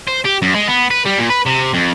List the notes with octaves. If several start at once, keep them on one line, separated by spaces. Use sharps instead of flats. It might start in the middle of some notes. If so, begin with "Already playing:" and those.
C5
G4
F#2
G#3
B3
B4
G3
A#2
B4
C3
F2